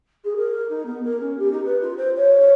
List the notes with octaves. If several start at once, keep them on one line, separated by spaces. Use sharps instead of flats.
G#4
A#4
D#4
B3
A#4
C#4
G4
D#4
B4
F4
C5
C#5